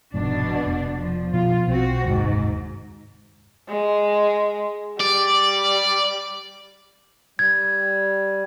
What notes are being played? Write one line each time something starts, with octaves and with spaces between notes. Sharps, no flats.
F1 F2 G#2 B2 D4
F1 B3
F3
B2 F3 B3 F4
B1 C4 F#4
F#1 D#2 G#2 C3
G#3
G3 D5
G3 G#6